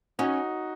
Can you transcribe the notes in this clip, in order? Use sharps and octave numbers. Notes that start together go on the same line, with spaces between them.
C#4 D#4 F#4